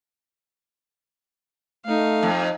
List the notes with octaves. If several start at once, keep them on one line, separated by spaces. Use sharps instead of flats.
A3 D#4 F5
F2